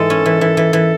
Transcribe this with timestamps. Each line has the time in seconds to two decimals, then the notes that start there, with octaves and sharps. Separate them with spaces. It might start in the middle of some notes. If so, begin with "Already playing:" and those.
Already playing: G#2 E3 G#3 A4
0.10 C#4
0.26 E3
0.41 E3
0.57 E3
0.73 E3